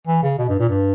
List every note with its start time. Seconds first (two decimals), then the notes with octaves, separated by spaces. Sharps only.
0.07 E3
0.23 C#3
0.38 B2
0.49 G2
0.60 A#2
0.69 G2